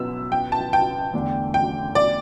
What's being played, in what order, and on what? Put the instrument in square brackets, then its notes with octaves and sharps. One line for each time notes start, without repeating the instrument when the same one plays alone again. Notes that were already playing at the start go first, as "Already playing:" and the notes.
Already playing: [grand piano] B2 F#3 B3 [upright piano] E6
[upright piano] G5
A5
G5
[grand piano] E2 D3 A3 D4
[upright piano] G5
D5